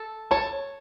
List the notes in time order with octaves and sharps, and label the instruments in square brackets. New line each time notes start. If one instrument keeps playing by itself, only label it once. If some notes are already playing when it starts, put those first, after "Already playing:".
Already playing: [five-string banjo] A4
[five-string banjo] C#5 [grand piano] A5